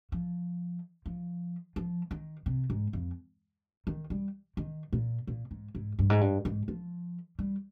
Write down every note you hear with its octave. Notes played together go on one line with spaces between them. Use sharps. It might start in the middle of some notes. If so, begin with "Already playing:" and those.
F3
F3
F3
D#3
C3
G#2
F2
D#3
G3
D#3
A#2
A#2
G#2
G#2
G2
G#2
G2
G#2
F3
G3